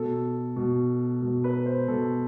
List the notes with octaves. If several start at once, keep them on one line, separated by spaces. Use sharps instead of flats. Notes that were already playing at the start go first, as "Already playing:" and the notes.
Already playing: B2 A4
B2
B2
B4
C5
B2 A4